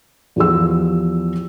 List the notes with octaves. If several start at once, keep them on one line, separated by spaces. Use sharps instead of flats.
E2 F3 G4 E6